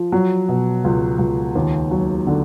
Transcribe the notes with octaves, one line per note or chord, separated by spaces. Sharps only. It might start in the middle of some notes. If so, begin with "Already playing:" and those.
Already playing: F3
F#3
B2
C#2
C#2
D#2
F#3
D3